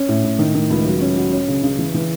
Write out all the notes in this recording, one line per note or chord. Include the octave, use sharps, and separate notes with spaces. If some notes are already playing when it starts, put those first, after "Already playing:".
Already playing: C#4
A2
A2
D#3
D#3
C#2
F#3
C#4
F#4
C#4
C#3
C#3
E3
E3